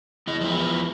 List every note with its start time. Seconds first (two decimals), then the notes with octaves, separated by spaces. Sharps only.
0.27 E2 B3 D#5
0.41 F3 G#3 E4